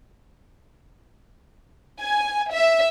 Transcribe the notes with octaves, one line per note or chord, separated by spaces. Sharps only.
G#5
E5